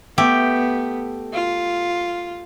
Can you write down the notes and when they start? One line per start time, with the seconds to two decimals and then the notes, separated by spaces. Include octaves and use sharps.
0.18 A3 B3 G4
1.33 F4